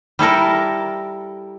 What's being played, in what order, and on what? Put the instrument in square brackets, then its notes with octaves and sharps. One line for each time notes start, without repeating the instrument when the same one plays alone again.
[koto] G3 E4 A4 A#4